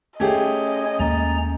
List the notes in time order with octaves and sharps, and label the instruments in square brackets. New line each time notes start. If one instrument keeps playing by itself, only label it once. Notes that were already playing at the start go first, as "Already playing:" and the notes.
[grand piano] A3 G4 G#4 [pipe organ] C#4 C#5 [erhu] D#5
[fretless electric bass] D#2 G#3 A#3 [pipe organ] C#4 A#5 A6